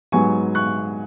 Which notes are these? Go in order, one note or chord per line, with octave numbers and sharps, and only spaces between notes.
G#2 F#3 B3 G#5 C#6
C#6 F#6